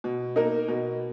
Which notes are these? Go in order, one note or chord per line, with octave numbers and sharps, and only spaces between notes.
B2
A#3 D#4 A#4
B2